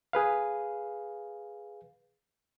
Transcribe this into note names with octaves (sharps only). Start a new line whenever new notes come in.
G#4 B4 F5